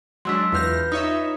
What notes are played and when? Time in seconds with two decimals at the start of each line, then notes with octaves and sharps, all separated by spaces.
0.25 F#3 G#3 D4 C6 E6 B6
0.52 E2 F4 B4 F6 G6 A#6
0.92 D#4 F4 C#5 E5 D#6